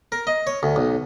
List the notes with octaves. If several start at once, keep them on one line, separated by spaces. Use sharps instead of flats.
A#4
D#5
C#5
D2
B1